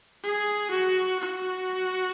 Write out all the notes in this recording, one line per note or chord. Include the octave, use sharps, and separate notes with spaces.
G#4
F#4
F#4